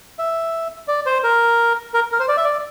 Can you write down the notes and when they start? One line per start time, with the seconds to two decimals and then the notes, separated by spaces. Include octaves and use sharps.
0.19 E5
0.88 D5
1.06 C5
1.24 A#4
1.94 A#4
2.12 A#4
2.20 C5
2.28 D5
2.37 E5
2.44 D5